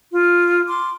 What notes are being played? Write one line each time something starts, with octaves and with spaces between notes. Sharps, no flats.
F4
C6 D6